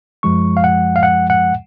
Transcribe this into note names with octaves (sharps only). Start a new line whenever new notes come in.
F#2 F3 G#3 C#6
F5
F#5
F5
F#5
F#5